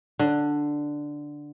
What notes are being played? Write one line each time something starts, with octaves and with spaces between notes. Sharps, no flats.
D3